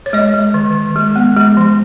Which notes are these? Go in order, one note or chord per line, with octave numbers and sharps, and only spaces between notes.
C#5
G#3 D#5
G#3
D#3
D#3
G#3
B3
G#3
F3